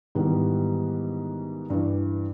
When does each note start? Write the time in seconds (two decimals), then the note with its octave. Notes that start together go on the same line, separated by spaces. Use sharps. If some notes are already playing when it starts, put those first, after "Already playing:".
0.15 G#2 D#3 E3 G3 B3
1.70 G2 E3